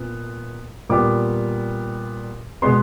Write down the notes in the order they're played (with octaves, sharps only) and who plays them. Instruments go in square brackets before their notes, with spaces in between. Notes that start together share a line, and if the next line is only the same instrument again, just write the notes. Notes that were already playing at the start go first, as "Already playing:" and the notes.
Already playing: [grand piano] A#2 B3
A#2 G3 B3 D6
B2 G#3 B3 C6